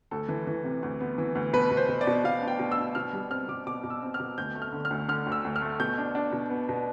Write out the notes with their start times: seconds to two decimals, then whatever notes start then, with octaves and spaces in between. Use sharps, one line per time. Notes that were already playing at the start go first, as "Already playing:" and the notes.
0.11 D2 A4
0.28 E3
0.47 E3
0.64 C3
0.83 D2
1.00 B3
1.18 E3
1.35 D2
1.53 B2 B4
1.71 B2
1.77 C5
1.89 B2
2.01 D5
2.07 B2
2.24 B2 F5
2.42 D4
2.48 G5
2.59 B2
2.72 E6
2.77 D4
2.95 B2 F6
3.13 G3
3.30 C4 F6
3.48 B2 D6
3.67 B2 D6
3.84 B2
3.90 E6
4.02 C4
4.14 F6
4.20 B2
4.38 D2 G6
4.55 A3
4.62 F6
4.72 D3
4.85 F6
4.91 D2
5.08 D3 F6
5.27 D2
5.32 E6
5.45 D2
5.56 F6
5.61 A3
5.80 B2 G6
5.98 D4
6.15 D4
6.33 B2
6.50 B3
6.69 B2